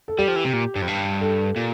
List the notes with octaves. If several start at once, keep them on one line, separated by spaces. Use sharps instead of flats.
A4
G3 G4
F3
E3
C3
A#2
G2
F2
G2
A4
A#2